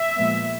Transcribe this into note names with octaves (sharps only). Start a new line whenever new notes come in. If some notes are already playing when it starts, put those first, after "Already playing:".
Already playing: E5
A#2 F3 G#3 B3